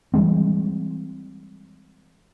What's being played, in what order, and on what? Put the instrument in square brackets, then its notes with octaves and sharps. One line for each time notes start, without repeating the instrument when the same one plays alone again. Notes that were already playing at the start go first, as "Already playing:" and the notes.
[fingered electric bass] E3 G3 G#3 C4